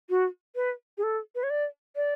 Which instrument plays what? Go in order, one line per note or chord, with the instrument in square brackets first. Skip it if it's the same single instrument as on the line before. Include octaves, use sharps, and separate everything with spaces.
[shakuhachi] F#4
B4
G#4
A4
B4
C#5
D5
D5